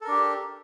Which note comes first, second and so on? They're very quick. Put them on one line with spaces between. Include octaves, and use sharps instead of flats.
A4 A#4 D4 G4